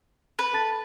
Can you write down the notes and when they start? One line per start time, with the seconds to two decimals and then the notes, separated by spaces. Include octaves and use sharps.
0.39 B4
0.53 A4 A5 A6